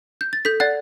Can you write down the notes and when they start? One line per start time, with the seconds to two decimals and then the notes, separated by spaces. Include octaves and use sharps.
0.21 G6
0.33 A6
0.45 A4 G6 B6
0.60 D5 F#5 F#6 A6